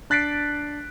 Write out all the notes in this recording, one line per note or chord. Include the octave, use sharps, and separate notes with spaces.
D4 F#6 A6 B6 C7 D7